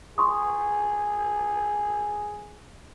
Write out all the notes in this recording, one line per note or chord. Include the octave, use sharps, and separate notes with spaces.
G#4 C6 C#6 D#6